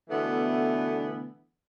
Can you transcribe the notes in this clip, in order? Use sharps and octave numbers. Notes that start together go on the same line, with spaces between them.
B2 D3 E3 A3 B3